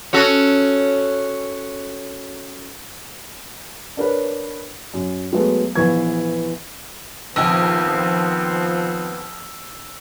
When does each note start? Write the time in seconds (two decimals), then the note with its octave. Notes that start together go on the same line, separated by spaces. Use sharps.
0.13 C#4 F#4 A4
3.97 D4 A#4 B4 C#5
4.94 F#2
5.33 F#3 G#3 A3 B3
5.75 A#1 E3 B3 C#6 G#6
7.36 A#1 F2 D#3 F3 B3 C4 E6